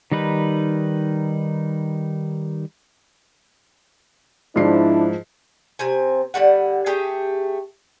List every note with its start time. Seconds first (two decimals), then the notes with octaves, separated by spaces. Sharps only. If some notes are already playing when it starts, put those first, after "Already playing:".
0.12 D#3 G3 D#4 B4
4.56 G#2 F3 D4 E4 C7
5.79 C3 C4 G#5
6.34 D3 G3 F#4 F#5
6.86 A3 G4 G#4 G5